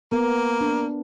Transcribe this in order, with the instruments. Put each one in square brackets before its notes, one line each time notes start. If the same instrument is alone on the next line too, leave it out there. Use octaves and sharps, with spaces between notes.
[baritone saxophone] A#3 [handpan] B3 A#4
[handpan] D4